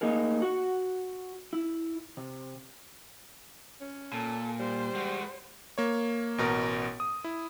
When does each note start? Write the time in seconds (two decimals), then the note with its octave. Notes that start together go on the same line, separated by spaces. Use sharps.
0.01 A3 A#3 D#4 G#4 A#4
0.42 F#4 F#5
1.53 E4
2.17 C3
3.81 C#4
4.13 A#2 A4
4.60 G3 C5
4.95 G#3 F#4
5.78 A#3 C#5
6.38 A1 B2 A#4
7.00 D#6
7.24 E4